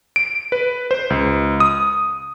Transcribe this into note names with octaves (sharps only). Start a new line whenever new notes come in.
D7
B4
C5
C#2
D#6